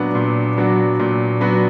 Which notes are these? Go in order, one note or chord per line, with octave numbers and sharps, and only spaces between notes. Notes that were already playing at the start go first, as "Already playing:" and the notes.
Already playing: A#2 F#3 B3 D4 F#4
A#2
F#3 B3 D4 F#4
A#2
F#3 B3 D4 F#4